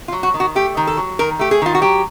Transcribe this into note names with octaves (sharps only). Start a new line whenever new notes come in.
F4
F#3
F#4
D#3
F#4
A3 G4
D#3
A4
F#3
D#3 A#4
A3 G4
G#4
D#3 F4
F#4
F#3 G4